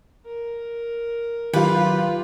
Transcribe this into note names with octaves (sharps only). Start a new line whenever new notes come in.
A#4
D#3 F#3 F4 G4 B4